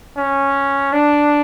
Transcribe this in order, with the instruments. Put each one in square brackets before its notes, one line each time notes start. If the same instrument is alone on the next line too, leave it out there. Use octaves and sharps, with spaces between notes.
[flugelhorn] C#4
D4